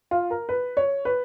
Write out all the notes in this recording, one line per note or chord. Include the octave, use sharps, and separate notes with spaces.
F4
A#4
B4
C#5
B4